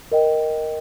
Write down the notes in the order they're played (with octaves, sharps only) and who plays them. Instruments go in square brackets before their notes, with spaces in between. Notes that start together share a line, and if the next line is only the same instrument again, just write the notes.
[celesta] A#4 D#5 G5